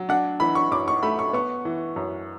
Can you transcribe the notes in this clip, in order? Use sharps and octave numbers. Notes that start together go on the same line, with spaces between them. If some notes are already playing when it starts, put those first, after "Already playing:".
Already playing: F#3
D4 F#5
E3 B5
C#6
F#2 D6
C#6
A3 B5
C#6
B3 C#6
E3
F#2